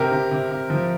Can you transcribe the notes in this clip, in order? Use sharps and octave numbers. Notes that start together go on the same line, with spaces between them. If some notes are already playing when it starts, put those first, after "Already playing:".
Already playing: C3 G4 A#4
C3
C3
C3
F3